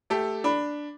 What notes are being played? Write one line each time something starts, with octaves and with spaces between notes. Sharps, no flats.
A3 G4 A4
D4 B5